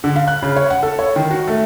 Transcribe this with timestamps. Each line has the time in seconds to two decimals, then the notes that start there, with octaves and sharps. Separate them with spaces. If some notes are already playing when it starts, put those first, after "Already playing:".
0.04 D3
0.16 F5
0.27 F#6
0.43 C#3
0.56 C#5
0.70 F#5
0.83 A4
0.99 C#5
1.16 D#3
1.30 F#4
1.48 A3